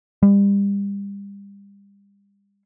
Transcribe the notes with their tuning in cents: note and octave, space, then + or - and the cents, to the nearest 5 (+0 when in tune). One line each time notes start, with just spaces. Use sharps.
G3 +35